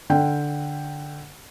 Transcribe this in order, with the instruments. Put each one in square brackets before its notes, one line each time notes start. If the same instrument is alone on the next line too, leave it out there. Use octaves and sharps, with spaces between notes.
[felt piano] D3 G5